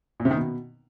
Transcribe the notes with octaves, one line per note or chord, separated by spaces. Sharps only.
A#2
C3
D#3
B2